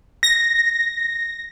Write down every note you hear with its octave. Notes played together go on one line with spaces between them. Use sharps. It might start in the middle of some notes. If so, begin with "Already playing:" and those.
A#6